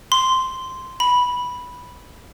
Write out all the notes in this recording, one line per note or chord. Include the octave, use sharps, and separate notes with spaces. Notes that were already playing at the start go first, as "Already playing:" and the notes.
C6
B5